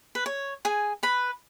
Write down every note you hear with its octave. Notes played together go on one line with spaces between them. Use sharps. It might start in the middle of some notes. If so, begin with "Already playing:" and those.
B4
C#5
G#4 G#5
B4 B5